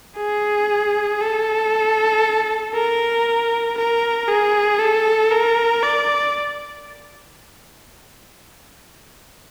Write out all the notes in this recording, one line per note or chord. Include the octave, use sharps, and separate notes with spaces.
G#4
A4
A#4
A#4
G#4
A4
A#4
D5